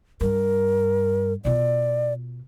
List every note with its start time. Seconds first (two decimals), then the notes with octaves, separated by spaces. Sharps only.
0.21 G2 G3 A#4
1.45 B2 F4 D5